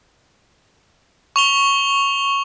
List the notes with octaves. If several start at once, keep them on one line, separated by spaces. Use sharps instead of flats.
C#6 F7 G7